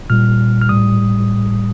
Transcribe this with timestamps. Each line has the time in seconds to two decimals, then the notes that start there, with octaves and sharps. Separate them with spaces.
0.10 A#2 G3 F6
0.61 F6
0.69 A2 G3 D#6